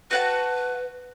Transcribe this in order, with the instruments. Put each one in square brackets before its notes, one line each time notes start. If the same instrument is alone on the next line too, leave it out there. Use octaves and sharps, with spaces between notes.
[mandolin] F#4 F#5 A5 [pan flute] B4